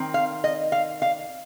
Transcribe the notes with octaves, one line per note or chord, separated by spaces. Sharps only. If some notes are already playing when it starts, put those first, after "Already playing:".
Already playing: D#3 C4
F5
D#5
F5
F5